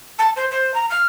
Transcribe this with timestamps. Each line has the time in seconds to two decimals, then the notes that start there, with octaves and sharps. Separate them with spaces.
0.18 A5
0.36 C5
0.51 C5
0.74 A#5
0.89 F6